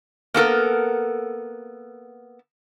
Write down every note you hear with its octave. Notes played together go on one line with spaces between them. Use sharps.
A#3 B3 A4 A#4